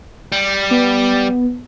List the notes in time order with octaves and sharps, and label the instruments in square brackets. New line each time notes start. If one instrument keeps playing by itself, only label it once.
[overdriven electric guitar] G3
[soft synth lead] B3